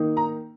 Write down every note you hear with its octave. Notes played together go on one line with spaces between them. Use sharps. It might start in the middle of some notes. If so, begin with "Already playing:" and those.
Already playing: D#3 A#3 D#4
A#5